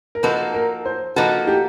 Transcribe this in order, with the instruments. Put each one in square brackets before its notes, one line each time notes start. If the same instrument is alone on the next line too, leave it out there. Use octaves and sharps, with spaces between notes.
[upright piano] A#4
[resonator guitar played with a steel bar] F3 A#3 D#4 F#4 A4 [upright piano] B4
[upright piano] A#4
C5
[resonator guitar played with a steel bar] F3 A#3 D#4 F#4 A4 [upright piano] B4
[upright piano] G4